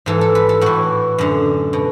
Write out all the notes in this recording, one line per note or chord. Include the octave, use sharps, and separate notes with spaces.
G#2 E3 A4
A4
B4
A4
A2 E3 F#4
F#2 D3
B2